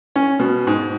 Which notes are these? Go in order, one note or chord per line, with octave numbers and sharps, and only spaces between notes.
C#4
B2
G#2